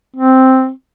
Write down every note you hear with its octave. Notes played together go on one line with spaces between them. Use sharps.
C4